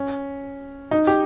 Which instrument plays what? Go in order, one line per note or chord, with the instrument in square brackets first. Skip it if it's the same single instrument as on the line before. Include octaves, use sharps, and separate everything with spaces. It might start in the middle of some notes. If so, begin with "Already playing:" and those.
Already playing: [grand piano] C#4
D#4
G4